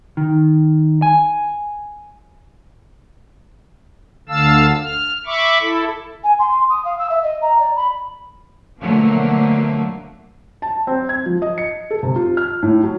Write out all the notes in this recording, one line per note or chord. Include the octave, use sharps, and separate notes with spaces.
D#3
G#5
D2 D3 F5 A5 E6
F6
E5 B5 C#6 D6
E4 A4
G#5
C6
C6
D#6
F5
E6
E5
D#5
A#5
D5
B5
B2 D3 F3 F#3 A3 A#3
A5
C4
G#6
F3
D#5
C#7
A4
C3
F4
F6
A2
F#3